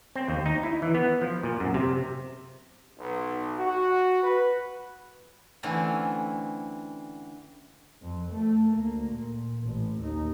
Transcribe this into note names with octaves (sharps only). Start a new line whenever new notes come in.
C4
D#2
D#4
E4
E3
B3
F3
A#2
F#2
C3
B1
F#4
B4
D3 E3 A3 C4 C#4 E4
F2
A3
D2 A#3
A#2
A1
D#2 D#4